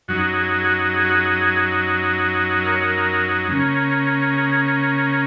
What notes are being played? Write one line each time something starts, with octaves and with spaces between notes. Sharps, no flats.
F#2 F#3 D#4 F#4
G#4
G#4
F#4
G#4
F#4
G#4
A#4
C#5
A#4
C#3 A#3 C#4
G#4